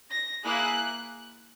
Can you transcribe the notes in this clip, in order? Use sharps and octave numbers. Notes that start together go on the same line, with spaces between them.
A#6
A#3 E4 G#4 F#6